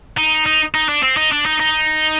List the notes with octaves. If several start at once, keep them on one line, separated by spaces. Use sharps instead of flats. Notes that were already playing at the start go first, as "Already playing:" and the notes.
D#4
D#4
D#4
D4
C4
D#4
D4
D#4
D#4